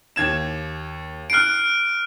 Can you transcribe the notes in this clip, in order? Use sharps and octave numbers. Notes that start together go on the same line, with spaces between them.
D#2 G#6 E7
F6 F#6 C7 D7